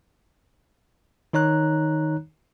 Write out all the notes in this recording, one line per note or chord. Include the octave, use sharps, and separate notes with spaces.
D#3 D#4 C#5 A#5 F#6